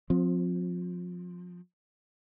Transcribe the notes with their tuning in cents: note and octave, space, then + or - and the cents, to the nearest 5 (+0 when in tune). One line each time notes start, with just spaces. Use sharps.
F3 +30 C4 +5